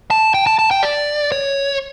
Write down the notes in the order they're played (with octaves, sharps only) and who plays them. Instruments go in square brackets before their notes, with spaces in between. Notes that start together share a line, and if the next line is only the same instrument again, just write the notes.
[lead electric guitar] A5
G5
A5
A5
G5
D5
C#5